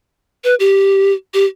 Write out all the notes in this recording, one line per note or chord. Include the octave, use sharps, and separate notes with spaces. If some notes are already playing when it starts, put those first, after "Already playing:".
B4
G4
G4